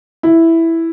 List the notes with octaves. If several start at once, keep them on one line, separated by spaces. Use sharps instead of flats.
E4